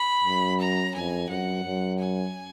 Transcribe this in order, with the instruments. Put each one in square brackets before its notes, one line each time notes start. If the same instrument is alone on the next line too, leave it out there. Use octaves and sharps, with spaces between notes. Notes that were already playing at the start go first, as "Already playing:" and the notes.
Already playing: [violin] B5
[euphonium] F#2
[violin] A#5
[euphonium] F2 [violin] G#5
[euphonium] F#2 [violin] F#5
[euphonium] F#2
[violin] G#5